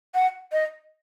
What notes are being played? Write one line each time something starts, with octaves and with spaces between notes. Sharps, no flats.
F#5
D#5